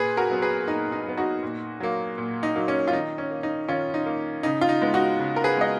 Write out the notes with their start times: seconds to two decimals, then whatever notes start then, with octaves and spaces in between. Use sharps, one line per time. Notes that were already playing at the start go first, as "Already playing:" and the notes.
Already playing: A#2 G#4 B4
0.17 F#4 A#4
0.30 F#3 B3
0.42 G#4 B4
0.68 A#2 D#4
0.92 D#4
1.05 F#3 B3
1.17 D#4 F#4
1.43 A#2
1.80 F#3 A#3
2.18 A#2
2.43 D#4
2.56 F#3 A#3
2.68 C#4
2.88 F4
2.93 D#3 D#4
3.18 C#4
3.31 A#3
3.43 D#4
3.68 D#3 C#4 F4
3.94 D#4
4.06 A#3
4.43 C#3 D#4
4.61 F4
4.69 D#4
4.82 G#3 B3
4.94 D#4 F#4
5.19 C#3
5.36 A#4
5.44 G#4 B4
5.56 G#3 B3 D#5